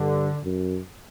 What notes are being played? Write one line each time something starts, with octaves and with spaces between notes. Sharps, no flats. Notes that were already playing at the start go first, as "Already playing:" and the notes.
Already playing: G2 D3
F#2